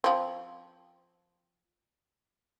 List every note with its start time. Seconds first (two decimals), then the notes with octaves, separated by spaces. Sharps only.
0.04 F3 C4